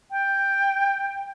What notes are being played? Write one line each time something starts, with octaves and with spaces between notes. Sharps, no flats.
G5